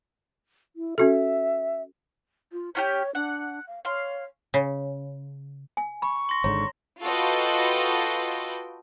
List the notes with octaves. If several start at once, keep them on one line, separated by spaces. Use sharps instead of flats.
E4
C#4 F#4 A4 E5
F4
C#4 F4 G4 C#5
D4 F#5
F5
C#5 F5 C6
C#3
G#5
B5 C#6
C6 A#6
G#1 G#2 D3 C#5 A#5
F4 F#4 A4 B4 D#5 G5